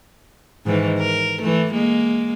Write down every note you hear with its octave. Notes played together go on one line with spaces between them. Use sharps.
G#2 D#3 E3
A#4
E3 A3
G#3 A#3